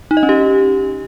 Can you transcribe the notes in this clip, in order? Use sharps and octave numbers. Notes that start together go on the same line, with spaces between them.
D#4
D#5
C#4
G4